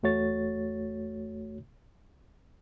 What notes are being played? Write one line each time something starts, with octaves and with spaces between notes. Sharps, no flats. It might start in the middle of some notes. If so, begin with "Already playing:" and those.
E2 A3 F#4 C#5 A6